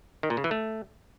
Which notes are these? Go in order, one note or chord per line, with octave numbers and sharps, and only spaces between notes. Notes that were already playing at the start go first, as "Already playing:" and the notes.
D#3
A#2
C#3
E3
A3